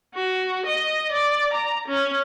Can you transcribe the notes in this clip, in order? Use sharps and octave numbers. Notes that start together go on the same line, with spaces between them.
F#4
D#5
D5
A#5
C#4